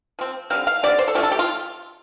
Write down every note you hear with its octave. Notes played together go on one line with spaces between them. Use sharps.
F3 C4
D3 G3 C4 F5
F5
D3 G3 C4 D5
C5
A4
D3 F3 A3 G4
A4
G4
F4